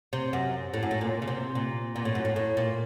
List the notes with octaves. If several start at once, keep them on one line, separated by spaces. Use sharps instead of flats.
C3
F#2
A2
F#2
A2
A#2
C#3
C3
A#2
A#2
A2
F#2
A2
A2
A#2